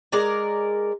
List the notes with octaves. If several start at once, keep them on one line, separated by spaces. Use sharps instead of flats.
G#3 A#4 D5